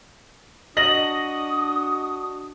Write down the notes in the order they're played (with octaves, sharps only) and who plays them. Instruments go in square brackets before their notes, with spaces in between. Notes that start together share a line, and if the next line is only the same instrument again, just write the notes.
[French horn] D4 [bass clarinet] F#4 [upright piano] D#5 A#6 F#7 [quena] D#6